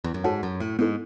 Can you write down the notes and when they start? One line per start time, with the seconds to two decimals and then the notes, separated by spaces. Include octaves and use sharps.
0.04 E2
0.14 F#2
0.24 G#2 F#4 A4 C#5 F#5 A5
0.43 F#2
0.60 A2
0.79 G#2 B3 E4 A4